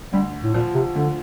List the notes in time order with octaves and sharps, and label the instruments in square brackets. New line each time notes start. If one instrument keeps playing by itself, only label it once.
[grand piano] D2 [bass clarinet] G3
[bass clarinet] A2
[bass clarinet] A#2 [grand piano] F3
[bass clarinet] C3
[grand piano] D2 [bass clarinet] D3